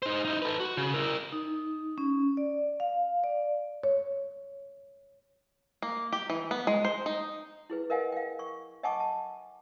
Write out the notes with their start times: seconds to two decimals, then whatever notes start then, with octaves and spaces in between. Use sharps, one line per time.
0.03 D#4 C5
0.25 D#4 E4
0.42 A4 B4
0.60 F#4
0.77 C#3
0.94 E4 A#4
1.32 D#4
1.98 C#4
2.37 D5
2.80 F5
3.24 D5
3.84 C#5
5.82 A#3
6.13 G4
6.30 E3
6.51 B3
6.67 G#3
6.85 C5
7.06 D#4
7.70 E4 G#4 B4
7.90 A#4 B4 D#5 F5 F#5 G#5
8.12 F5 G5
8.39 C#6
8.83 D#5 F#5 G#5 A5 C#6 D6
9.00 A5